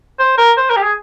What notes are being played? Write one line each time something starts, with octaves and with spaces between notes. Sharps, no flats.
C5
A#4
C5
A#4
G4
G#4